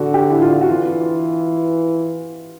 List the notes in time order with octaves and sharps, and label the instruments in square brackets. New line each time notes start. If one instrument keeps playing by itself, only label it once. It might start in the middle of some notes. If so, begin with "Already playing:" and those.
Already playing: [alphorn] D3 [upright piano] F#4
[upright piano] G4
E4
F4
F#4
[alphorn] E3 [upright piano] F4